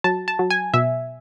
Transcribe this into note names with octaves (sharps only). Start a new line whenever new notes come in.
F#3 A5
A5
F#3
G#5
B2 E5